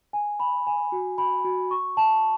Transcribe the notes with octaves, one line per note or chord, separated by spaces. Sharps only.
G#5
B5
G#5
F#4
B5
F#4
C#6
A5